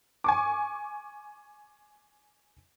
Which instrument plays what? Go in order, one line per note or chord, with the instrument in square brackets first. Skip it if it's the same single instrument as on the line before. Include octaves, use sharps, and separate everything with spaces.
[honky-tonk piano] G#5 C#6 D6